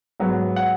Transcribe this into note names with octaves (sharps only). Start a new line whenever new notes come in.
G#2 F#3 B3
F#5